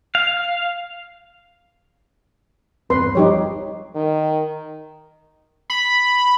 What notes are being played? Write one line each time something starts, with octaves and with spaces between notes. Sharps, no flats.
F5
G1 E2 C4 B4 C6
F3 G3 D#4 G4 C#5
D#3
B5